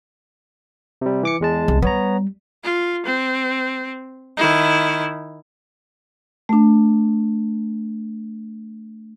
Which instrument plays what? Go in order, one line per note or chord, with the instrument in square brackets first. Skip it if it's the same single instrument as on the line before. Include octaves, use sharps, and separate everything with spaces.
[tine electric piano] C3 G3
E3 D6 C#7
E2 G#3 A5
[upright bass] C2
[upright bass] G3 [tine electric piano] B3 C#5 A#5
[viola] F4
C4
D#3 E4
[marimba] A3 D4